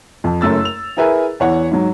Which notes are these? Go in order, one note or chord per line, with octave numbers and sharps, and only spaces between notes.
F2
F#1 F#2 A3 E6 A6
F7
E4 G#4 A#4 B4 E5 G#5
E2 C#5 F#5
G#2 F#3